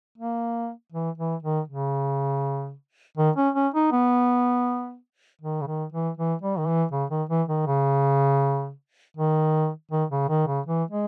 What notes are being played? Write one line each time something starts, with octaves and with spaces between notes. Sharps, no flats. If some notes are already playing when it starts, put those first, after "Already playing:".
A#3
E3
E3
D#3
C#3
D#3
C#4
C#4
D#4
B3
D#3
C#3
D#3
E3
E3
G3
D#3
E3
C#3
D#3
E3
D#3
C#3
D#3
D#3
C#3
D#3
C#3
E3
G#3